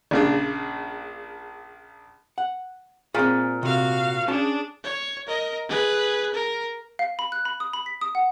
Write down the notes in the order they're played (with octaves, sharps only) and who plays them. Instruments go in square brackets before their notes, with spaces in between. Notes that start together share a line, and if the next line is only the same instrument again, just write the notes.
[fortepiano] A#1 C#3 D4
[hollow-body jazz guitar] F#5
[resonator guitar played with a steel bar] A#2 [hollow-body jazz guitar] C4 G#4
[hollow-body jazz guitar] C3 [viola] F#4 F5
[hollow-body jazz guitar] C#4 C#5 A5 [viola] D4 G#4
[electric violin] C#5
A#4 D#5
G#4 B4
A#4
[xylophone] F5
B5
F#6
B5
D#6
B5
B6
D#6
F#5